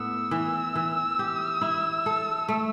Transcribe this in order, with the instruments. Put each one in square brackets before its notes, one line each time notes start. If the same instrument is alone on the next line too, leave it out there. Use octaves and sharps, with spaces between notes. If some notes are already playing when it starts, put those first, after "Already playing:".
Already playing: [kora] A2 B3 [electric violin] E6
[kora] E3
E3
G4
E4
A4
A3